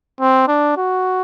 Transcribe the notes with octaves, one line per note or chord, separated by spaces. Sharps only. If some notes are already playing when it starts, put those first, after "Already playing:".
C4
D4
F#4